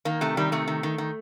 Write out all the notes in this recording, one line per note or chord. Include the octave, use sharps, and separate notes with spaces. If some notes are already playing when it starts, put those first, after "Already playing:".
D#3 A#3
C3 A3
D#3 G3
C3 A3
D#3
D#3
D#3